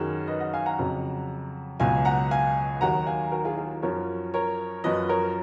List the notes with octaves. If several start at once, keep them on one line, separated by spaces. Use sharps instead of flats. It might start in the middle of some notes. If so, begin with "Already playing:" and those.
Already playing: F#2 D#3 F#3 G#4
B4 D#5
D#5 F#5
F5 G#5
F#5 A#5
F2 C#3 F#3
C#2 B2 F#3 F5 G#5
F#5 A#5
F5 G#5
D#2 D#3 F#3 F#5 A#5
F5 G#5
F#4 A#4
F4 G#4
F4 G#4
F#2 F3 A#4 C#5
A#4 C#5
F#2 F3 B4 D#5
A#4 C#5